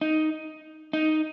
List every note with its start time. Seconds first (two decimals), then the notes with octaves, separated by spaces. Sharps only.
0.01 D#4
0.93 D#4